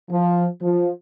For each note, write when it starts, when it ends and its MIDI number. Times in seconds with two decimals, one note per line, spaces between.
0.11 0.46 53
0.62 0.90 53